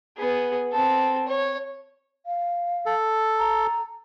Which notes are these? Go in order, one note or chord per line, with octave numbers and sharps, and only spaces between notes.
B3 G#4
C4 A4
C#5
F5
A4
A#5